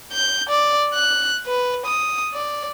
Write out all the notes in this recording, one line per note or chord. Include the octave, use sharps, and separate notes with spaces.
G6
D5
F#6
B4
D#6
D5